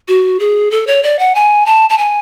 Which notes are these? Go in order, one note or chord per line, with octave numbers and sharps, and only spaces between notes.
F#4
G#4
A4
C#5
D5
F#5
G#5
A5
A5
G#5